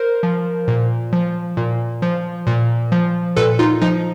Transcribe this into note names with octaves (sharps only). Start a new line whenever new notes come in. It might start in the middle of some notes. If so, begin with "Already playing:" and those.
Already playing: A#4 C5
F3
A#2
F3
A#2
F3
A#2
F3
A#2 A4 B4
D#4 F4
F3 D#4